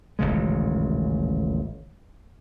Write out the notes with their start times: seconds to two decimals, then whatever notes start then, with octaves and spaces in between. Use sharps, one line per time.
0.19 D#1 A1 C#3 G#3